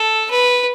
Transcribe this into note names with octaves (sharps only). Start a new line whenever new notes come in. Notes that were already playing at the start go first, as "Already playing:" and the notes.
Already playing: A4
B4